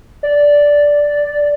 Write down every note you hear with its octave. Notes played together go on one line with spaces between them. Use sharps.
D5